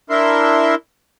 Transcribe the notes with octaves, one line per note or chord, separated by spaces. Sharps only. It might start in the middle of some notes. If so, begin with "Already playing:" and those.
D4 E4 A#4 E5 C6